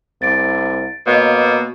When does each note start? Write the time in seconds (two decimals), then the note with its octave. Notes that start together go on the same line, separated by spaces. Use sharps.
0.22 C2 A6 D7
1.07 B2 A#3 C#5 D#5 F5